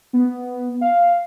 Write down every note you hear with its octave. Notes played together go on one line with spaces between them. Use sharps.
B3
F5